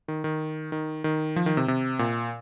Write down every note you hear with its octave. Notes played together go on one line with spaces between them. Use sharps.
D#3
D#3
D#3
D#3
F3
D#3
C3
C3
A#2